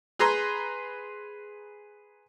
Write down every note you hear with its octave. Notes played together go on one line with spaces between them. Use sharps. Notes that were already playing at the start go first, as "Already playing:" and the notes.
G#4 B4 A#5 C6